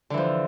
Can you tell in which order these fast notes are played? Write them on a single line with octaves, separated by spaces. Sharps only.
D3 E3 F3